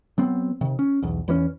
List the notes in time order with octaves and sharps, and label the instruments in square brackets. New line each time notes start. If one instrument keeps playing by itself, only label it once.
[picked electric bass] F#3 B3 C4
C3 D#3
C#4
B1 E2
E2 E3 F#3 C#4